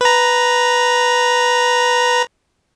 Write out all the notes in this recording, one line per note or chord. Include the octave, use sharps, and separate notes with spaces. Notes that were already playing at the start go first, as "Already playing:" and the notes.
B4 A#5